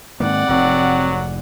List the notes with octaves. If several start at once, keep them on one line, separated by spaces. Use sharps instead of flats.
G#2 D#3 A#3 C4 D5 F#5
F1 G#2 F#3 C4